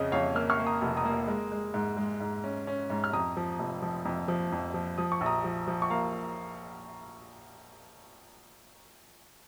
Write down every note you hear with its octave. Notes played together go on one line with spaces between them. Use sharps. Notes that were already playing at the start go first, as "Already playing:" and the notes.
Already playing: F2 C#3 D#5
F2 C#5 F5
A#3 F6
C#6 F6
A#3
A#5 D#6
F1
A#5 D#6
A#3
G#3
G#3
G#2
G#3
G#2
C#4
C#4
G#2
F6
F2 A#5 D#6
F3
F1
F3
F2
F3
F2
F3
F3 D#6
C#6
A#1
A#5 D#6
F3
F3
C#6
A#3 F5 A#5